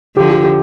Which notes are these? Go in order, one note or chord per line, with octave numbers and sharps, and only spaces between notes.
D3 F3 G4
G4
G4